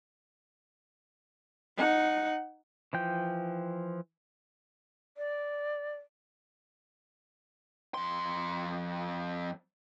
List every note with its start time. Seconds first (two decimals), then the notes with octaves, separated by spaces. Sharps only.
1.77 D#4 F#5
2.93 E3 F3 G5
5.17 D5
7.94 F2 C6